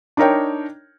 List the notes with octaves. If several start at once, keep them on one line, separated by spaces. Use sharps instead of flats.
D4 D#4 A#4 C#5 G5